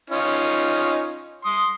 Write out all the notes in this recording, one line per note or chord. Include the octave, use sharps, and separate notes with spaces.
C#4 D#4 F4
C6 D#6